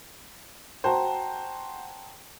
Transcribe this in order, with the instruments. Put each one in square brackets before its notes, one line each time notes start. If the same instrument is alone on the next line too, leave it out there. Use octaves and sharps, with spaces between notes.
[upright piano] F#4 C5 [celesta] G5 A5 A#5